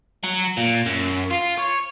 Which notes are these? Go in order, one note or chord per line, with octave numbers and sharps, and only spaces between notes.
F#3
A#2
F#2
F4
C#5